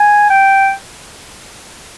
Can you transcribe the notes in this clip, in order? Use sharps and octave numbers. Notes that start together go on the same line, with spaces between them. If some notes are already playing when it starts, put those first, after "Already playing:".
Already playing: G#5
G5